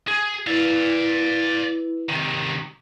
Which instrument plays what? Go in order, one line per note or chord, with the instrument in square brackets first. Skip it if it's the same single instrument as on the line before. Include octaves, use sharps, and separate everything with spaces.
[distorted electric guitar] G#4
[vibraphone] E4 B4 [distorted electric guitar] D5 F5
[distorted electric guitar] C3 D#3